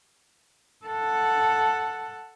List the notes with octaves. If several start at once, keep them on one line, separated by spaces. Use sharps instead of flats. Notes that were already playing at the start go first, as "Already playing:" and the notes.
A4 F#5